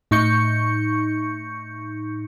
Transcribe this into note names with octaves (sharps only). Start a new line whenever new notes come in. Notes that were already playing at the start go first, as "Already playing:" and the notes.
A2 D#4 C#6 G6 C#7